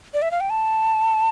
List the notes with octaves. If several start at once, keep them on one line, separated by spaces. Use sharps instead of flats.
D5
E5
F5
G5
A5